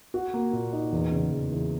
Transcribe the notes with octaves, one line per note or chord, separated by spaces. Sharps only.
F#4
A#3
A#2
D#4
E2
C#3
E2
E3